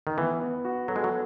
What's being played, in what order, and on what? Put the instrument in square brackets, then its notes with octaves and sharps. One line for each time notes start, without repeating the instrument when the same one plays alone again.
[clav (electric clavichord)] D#3
[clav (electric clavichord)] E3 [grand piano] B3
[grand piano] B3
F#4
[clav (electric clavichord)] F#3 [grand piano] A4
[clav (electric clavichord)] G#3
F#3